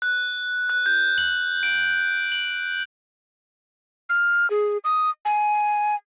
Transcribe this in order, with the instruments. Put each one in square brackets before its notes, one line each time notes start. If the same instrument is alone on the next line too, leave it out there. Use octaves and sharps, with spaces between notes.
[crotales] F#6
F#6
G6
F#7
D7
F#7
[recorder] F6
G#4
D#6
G#5